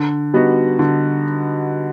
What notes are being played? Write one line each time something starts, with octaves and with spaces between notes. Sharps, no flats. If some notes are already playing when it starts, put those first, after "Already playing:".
Already playing: D3
G3 B3 D#4 F#4
D3